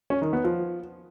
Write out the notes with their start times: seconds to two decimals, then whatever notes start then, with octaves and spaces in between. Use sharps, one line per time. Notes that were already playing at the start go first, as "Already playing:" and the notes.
0.10 C#4
0.22 D#3
0.33 B3
0.44 F3